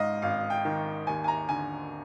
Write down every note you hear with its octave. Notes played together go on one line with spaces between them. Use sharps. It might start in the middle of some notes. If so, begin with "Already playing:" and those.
Already playing: G#1 G#2 D#5 F5
G#1 F5
G5
D#3
D#2 G#5
G#5
A#5
D3 G#5